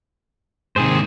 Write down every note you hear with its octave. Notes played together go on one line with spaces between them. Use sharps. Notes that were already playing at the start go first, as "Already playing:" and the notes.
G#2 C3 D#3 G#4 C5